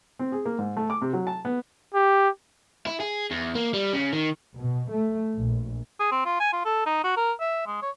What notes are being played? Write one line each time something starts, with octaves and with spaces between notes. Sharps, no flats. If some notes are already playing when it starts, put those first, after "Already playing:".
C4
G#4
A#3
G#2
A3
D6
C3
F#3
A5
B3
G4
E4
G#4
E2
A#3
G3
C#3
D#3
B2
A3
A#1
G#4
C4
F4
G#5
F4
A4
D#4
F#4
A#4
E5
G#3
C#5